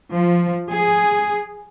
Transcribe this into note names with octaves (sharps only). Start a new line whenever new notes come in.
F3
G#4